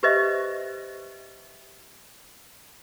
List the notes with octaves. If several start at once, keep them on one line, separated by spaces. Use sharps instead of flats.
G4 B4 C5 D#5 E5